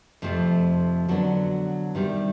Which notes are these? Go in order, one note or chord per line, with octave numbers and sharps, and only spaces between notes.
F2 C3 F3 A3
D3 F#3 B3 D4
C3 D#3 G3